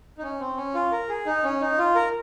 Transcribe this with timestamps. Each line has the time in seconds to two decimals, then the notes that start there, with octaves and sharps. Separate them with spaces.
0.18 D#4
0.22 C#4
0.40 C4
0.57 C#4
0.75 F4
0.92 A#4
1.09 G#4
1.26 D#4
1.44 C#4
1.61 D#4
1.78 F4
1.95 A#4